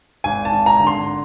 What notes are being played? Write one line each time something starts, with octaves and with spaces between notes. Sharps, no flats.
G#1 G#5
A5
G#1
A#5
D3
C6